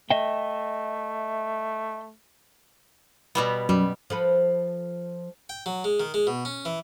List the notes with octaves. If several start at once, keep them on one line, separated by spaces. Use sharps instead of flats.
A3 D#5 E5 G5
B2 G3 B3
F#2 G3
F3 A4 B4
G5
F#3
G#3
D#3
G#3
B2
C#4
E3